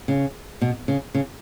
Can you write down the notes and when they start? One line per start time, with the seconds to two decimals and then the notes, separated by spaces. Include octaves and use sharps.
0.08 C#3
0.62 B2
0.88 C#3
1.14 C#3